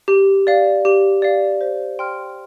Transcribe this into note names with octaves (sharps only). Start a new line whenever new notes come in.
G4
D5 F5
G4
D5 F5
C5
G5 C6 F6